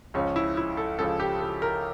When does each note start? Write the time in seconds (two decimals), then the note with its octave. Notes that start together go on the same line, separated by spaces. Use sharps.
0.14 C#2 C#3 F3 C#4
0.36 E4
0.57 E4
0.77 A4
0.99 C#2 C#3 F3 A4
1.20 G4
1.41 A4
1.62 A#4